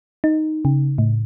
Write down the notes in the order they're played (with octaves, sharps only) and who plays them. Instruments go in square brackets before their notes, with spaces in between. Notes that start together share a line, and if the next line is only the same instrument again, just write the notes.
[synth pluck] D#4
C#3
A2